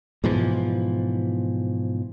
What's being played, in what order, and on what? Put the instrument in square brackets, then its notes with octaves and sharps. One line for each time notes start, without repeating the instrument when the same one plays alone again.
[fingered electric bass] G#2 B2 E3 F3